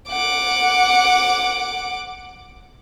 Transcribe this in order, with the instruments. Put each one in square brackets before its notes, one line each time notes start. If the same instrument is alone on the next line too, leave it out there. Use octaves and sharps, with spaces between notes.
[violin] F#5 D6